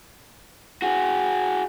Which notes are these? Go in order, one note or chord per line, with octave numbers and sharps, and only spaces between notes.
F#4 G#4